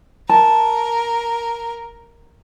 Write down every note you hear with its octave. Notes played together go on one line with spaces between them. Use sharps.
A#4 A5